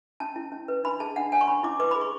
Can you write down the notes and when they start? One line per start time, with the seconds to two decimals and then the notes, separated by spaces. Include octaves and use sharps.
0.20 C#4 A5
0.36 E4
0.52 C#4
0.68 B4
0.84 D4 B5
1.00 G#4 A5
1.16 D4 F#5
1.32 C#5 G#5
1.41 C#6
1.48 C#4 B5
1.63 E4 D6
1.79 B4 D6
1.91 B5
1.95 G#4
2.01 C#6